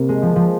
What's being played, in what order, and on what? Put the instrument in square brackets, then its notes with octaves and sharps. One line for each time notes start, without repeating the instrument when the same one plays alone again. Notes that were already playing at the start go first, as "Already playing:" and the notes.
Already playing: [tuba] C3 [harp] A#3
[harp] G#3
F3
F3